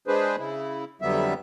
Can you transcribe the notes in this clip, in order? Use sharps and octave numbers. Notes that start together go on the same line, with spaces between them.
G#3 D4 G#4 B4 C5
C#3 E4
F2 D3 F#3 G3 B3 E5